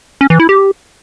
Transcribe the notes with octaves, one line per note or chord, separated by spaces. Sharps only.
C#4
E3
E4
G4